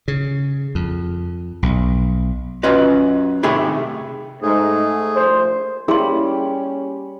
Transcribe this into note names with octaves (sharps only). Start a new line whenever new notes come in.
C#3
F2
B1
F#3 C#4 F4 B4 D#5
C3 D#3 A3 G4 G#4 B5
G#2 A3 G#4
A#1 C5
G3 A#3 C#4 E4 G4 G#4 C#5 C6